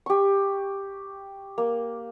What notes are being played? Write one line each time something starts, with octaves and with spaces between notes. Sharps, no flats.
G4 C#6
A#3